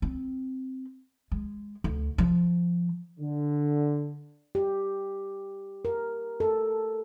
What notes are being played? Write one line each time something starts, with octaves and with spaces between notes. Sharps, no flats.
C4
G#3
D2
F3
D3
G4
A#4
A4